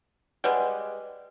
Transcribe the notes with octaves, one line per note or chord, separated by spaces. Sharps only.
G3 G#3 B4 F#5